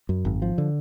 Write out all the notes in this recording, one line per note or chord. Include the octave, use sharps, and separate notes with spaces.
F#2
G#1
F3
D3